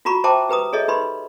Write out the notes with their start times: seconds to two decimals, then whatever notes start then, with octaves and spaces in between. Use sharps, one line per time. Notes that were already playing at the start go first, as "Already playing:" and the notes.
0.05 F4 F#4 A#5 B5 C#6
0.24 C5 E5 G5 A5 A#5 D6
0.49 G4 B4 A#5 D#6
0.73 G#4 A4 C#5 D#5 E5
0.88 D#4 G4 B4 B5 C6